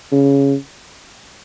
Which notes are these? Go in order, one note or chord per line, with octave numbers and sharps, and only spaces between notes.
C#3